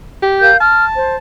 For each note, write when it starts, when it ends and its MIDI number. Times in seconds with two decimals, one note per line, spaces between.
0.22 0.51 67
0.41 0.57 70
0.41 0.57 77
0.41 0.57 91
0.61 1.18 81
0.61 0.84 89
0.98 1.15 72